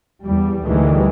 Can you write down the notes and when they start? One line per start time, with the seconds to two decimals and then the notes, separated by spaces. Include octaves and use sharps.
0.23 E2 G3
0.64 D2 D#3 E3 G3 G#3